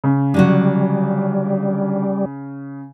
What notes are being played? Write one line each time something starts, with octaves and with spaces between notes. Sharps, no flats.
C#3
D3 F#3 G3 F#4